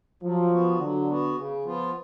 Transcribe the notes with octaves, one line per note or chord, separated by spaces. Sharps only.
F3 F#3
B3 F#4
D3 F#3
B3 F#4
C#3
F3 B3 F4